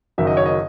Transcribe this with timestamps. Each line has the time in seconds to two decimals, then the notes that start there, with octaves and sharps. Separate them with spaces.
0.18 F#1 F#2 D#3 F#3 E5
0.27 D#5
0.37 C#5
0.46 D#5